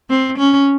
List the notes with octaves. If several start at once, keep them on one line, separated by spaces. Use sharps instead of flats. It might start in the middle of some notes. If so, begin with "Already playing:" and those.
C4
C#4